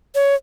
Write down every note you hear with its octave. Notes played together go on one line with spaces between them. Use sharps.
C#5